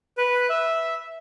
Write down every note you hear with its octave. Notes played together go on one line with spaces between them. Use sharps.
B4
E5